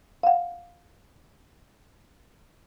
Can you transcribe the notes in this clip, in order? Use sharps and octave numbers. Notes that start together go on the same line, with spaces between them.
F5 F#5